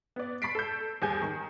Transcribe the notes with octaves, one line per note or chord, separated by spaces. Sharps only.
B3 D5
B5 C#6 A6 B6 C7 D7
A4 G6
D#2 G3 G#4 G#5 G6
D#3